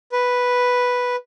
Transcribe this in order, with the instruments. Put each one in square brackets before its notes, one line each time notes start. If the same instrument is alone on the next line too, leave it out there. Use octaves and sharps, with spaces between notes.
[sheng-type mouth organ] B4